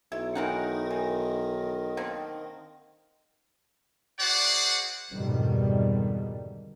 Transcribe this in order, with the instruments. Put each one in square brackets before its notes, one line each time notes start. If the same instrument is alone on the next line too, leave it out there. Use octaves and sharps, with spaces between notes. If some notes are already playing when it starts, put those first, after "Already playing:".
[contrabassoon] B1 [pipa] E4
[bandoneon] D#3 [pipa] E3 C4 F#5 [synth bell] D#4 A#4
[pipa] E3
D3 A#3 C4
[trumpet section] F#4 G#4 C5 D5 F#5
[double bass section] F2 G#2 B2 D3 D#3 G3